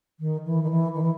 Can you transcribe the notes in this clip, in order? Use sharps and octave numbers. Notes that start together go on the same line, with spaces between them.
D#3
E3
D#3
E3
D#3
E3